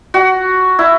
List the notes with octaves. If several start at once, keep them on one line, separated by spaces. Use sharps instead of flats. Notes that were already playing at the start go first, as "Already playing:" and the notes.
F#4
E4